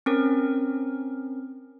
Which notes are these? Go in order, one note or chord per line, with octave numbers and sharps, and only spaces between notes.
C4 C#4 A#4